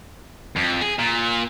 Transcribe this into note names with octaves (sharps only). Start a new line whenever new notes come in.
F2
G#4
A#2